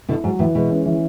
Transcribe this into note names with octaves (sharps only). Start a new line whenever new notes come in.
B2 D3 E4
G#2 F#3
A2 E3
B2 G#3
C#4
E3